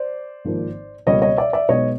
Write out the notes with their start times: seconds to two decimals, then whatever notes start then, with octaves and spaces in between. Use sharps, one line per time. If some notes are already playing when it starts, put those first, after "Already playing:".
Already playing: C5 D5
0.45 G#1 G#2 F3 A#3
1.06 C#2 B2 G3 A#3 C#5 D#5
1.22 C#5 D#5
1.37 D5 E5
1.53 D5 E5
1.69 B1 B2 G#3 B3 C#5 D#5